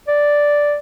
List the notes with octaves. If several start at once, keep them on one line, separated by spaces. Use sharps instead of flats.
D5